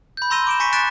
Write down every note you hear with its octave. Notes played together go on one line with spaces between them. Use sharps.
B5 G6
A#5 C6 E6 A#6 D#7 G7
D6 D7 E7
G#5 C#6 A#6 B6 C#7 D#7
C#6 F#6 A6 B6 D7 E7